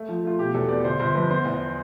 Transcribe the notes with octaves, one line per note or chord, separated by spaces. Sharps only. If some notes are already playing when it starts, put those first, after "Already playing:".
Already playing: A3
F3
A3 F4
B2 G4
E2 A4
B3 D5
G1 C5
G1 C5
F2 B4
B3 C5
E2